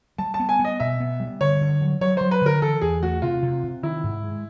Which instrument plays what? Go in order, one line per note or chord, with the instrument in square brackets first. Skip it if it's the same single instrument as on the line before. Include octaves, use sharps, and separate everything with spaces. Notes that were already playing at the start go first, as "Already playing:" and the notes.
[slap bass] G3 [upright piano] A5
[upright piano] A5
[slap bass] B3
[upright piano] G#5
[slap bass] B3
[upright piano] D#5
[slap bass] B2 [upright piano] E5
[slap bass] B3
G3
[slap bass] D3 [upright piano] C#5
[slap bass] D3
F#3
[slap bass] F#3 [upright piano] C#5
[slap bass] F#3 [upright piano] C5
[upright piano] B4
[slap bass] D3 [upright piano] A#4
[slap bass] E3 [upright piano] A4
[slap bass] E2 [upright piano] G#4
[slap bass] A3 [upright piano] F#4
[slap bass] C3 [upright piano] F4
[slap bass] C3
C3
[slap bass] D#3 [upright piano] E4
[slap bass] G#2
G#3